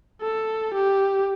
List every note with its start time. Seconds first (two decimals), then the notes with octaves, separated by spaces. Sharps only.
0.22 A4
0.74 G4